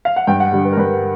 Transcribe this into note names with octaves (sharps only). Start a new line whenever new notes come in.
F5
F#5
G2 G5
F#5
D3 G3
B4
A#4
G2 B4